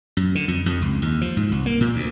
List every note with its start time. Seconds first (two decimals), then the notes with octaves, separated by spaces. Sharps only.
0.17 F#2
0.35 D3
0.48 F2
0.66 F2
0.82 C#2
1.02 D#2
1.21 F3
1.37 G#2
1.52 C2
1.66 A#3
1.81 A#2
1.96 D2